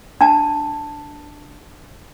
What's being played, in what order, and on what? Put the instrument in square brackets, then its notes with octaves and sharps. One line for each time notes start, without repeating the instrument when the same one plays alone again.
[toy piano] D4 A5